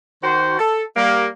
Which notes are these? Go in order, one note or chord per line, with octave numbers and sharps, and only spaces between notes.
D#3 F#4 C5
A4
G3 A#3